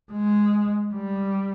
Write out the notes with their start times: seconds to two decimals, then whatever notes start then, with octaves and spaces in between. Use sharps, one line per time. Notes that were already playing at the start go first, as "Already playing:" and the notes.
0.12 G#3
0.94 G3